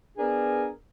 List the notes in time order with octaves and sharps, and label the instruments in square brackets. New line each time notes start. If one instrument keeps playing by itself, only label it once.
[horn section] B3 D4 G#4 A#4